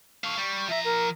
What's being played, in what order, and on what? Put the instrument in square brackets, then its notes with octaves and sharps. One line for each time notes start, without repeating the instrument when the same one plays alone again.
[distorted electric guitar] A4 F5 [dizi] C#6
[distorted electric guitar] G3
[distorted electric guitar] F3 A#5 [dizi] E5
[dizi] A#4